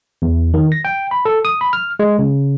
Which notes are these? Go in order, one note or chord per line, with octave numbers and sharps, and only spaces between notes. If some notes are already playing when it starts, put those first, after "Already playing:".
E2
D#3
A#6
G5
B5
A4
D#6
B5
F6
G#3
C#3